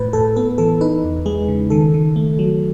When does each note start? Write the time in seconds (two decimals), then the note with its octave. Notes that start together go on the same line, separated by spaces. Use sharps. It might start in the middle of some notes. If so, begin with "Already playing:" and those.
Already playing: A2 B4
0.13 A2 A4
0.36 B3 A4
0.58 E3 A4
0.81 D#4 B4
1.04 E2
1.26 G#3 G#4
1.48 C#3
1.70 D#3 A4
1.94 D#3
2.16 A3
2.39 F#3